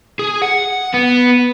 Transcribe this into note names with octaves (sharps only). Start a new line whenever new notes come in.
G#4
F#5
B3